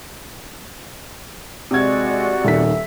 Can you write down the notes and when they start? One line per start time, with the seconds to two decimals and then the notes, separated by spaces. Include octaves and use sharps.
1.71 C3 G#3 F#4 D5 G#6
2.45 D#1 D#3 E5 B6